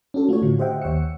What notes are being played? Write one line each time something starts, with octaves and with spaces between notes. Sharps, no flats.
C#4 D4 F#4 A4
A3 F4 F#4 C#5
A2 D3
G4 C5 D#5 E5 F#5 G5
D#2 C#5 F#5 E6 C#7